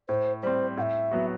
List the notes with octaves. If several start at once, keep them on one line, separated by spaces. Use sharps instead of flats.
A2 C5
G3 C4 C5
A2 E5 F#5
F#3 B3 F#4